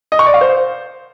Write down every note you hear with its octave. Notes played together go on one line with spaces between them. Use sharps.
D#5
C#6
D5
F5
C5